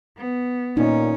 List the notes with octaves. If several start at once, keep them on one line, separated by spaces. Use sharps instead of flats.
B3
A#2 C#4 D#4